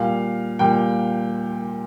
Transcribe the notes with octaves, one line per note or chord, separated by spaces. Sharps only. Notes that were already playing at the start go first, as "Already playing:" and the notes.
Already playing: A#2 G3 F5
A#2 G3 G5